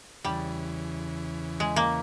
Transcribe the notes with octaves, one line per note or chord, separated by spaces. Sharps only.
E2 C#3 E3 G3
G#3
A#3